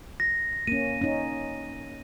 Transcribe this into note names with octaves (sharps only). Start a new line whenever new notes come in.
A#6
A#3 C#4 D#7
C#4 D#4